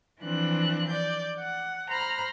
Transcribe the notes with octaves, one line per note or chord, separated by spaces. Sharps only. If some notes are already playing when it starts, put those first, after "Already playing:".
E3 F3 C4 D4 F#6
D5 G6
F#5
C5 A#5 B5 F6